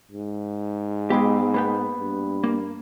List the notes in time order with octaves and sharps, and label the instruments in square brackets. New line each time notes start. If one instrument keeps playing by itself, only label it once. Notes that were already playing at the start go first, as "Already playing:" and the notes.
[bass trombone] G#2
[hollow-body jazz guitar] G#3 G4 [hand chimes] B3 B5
[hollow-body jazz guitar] A#3 B3 G5 [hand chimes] B5
[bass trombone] G2
[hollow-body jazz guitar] A#3